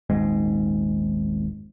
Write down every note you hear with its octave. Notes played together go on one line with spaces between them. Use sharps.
D#1 G#1 G#2 G#3